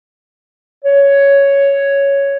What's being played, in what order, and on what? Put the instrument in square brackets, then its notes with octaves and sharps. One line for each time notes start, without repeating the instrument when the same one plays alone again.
[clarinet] C#5